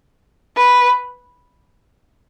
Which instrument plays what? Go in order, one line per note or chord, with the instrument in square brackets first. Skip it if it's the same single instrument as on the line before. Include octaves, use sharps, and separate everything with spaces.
[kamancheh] B4